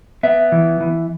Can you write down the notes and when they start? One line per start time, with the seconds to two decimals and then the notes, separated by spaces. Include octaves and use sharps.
0.23 B3 E5
0.52 E3
0.81 E3